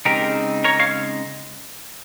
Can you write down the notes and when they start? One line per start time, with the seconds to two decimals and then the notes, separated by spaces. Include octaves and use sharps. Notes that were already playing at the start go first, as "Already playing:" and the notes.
0.05 C#3 G#3 C4 D#4 G4 A#4
0.64 A#4 C#5
0.79 C#5 F5